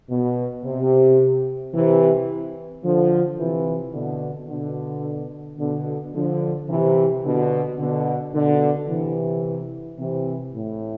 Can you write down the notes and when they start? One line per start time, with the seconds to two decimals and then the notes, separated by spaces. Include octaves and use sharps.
0.09 B2
0.65 C3
1.74 C3 E3
2.83 D3 F3
3.39 C3 E3
3.94 B2 D3
4.49 B2 D3
5.58 B2 D3
6.14 D3 F3
6.68 C3 E3
7.24 B2 D3
7.78 B2 D3
8.34 B2 D3
8.88 C3 E3
9.99 C3 E3
10.54 A2